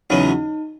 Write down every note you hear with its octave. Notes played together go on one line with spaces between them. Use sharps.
E2 C#3 F#3 B3 D#4